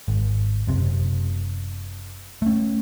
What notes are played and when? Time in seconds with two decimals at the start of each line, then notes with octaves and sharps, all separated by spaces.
0.08 G#1
0.67 F#1 C3
2.42 A3 C#4